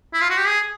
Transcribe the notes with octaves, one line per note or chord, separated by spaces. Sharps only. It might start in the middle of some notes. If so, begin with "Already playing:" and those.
E4
F4
F#4
G4
G#4